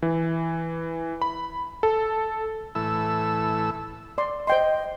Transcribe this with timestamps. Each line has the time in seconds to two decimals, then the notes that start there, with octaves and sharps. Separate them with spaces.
0.02 E3
1.22 B5
1.83 A4
2.75 A2 E3 A4 E6
4.18 D5 C6
4.47 C5 D#5 G5 C6